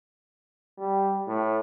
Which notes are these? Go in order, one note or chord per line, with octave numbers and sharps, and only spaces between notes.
G3
A2